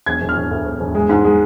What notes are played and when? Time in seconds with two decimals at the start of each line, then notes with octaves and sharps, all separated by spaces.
0.06 E1 G#6
0.21 E1
0.29 F6
0.35 E1
0.51 D2
0.66 E1
0.80 E1
0.95 G#3
1.09 G#2
1.24 G#3